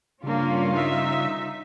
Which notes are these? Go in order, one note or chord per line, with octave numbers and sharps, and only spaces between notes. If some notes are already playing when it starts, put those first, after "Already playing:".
G2 C#3 A#3 C#4 D4 F4
D#4 E5